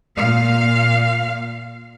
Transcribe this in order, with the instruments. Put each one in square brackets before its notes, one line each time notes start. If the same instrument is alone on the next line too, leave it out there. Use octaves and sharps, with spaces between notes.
[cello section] A#2 F5